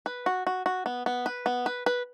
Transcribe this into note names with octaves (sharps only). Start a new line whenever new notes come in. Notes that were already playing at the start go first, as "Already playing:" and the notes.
B4
F#4
F#4
F#4
B3
B3
B4
B3
B4
B4